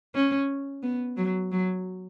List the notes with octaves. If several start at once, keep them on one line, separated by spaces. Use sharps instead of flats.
C#4
B3
F#3
F#3